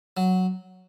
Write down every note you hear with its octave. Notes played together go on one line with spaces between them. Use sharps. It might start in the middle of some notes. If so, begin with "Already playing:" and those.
F#3